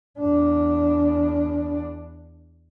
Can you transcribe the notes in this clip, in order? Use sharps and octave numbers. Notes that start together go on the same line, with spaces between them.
E2 D4